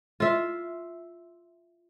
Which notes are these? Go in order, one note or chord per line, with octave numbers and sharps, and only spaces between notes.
F4 E5